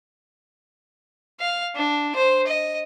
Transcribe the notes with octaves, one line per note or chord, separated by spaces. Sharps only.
F5
D4
C5
D#5